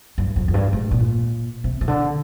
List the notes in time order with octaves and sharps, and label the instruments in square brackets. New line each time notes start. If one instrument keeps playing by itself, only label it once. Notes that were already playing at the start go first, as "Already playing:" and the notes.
[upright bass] G2
F2
F2
G2
G#2
A#2
C3
C3
D3